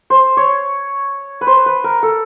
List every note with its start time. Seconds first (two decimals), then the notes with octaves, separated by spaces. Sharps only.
0.10 C5
0.37 C#5
1.41 B4
1.47 C5
1.66 B4
1.84 A#4
2.03 A4